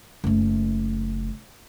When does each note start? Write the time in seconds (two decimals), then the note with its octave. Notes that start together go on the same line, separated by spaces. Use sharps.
0.24 F#1 A3